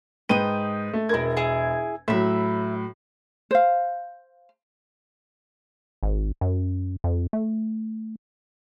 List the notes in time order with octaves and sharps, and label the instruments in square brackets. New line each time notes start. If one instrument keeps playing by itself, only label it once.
[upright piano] G#2 B4 D#7 [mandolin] G5 D#6
[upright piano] A3
[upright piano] E1 G#6 [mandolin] E4 A#4
[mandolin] E4 G#4
[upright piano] A2 F#3 [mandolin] E5 B5
[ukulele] C5 F5
[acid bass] G#1
F#2
F2
A3